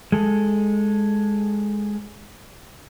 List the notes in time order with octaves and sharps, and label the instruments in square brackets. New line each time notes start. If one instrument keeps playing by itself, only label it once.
[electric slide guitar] G#3 A4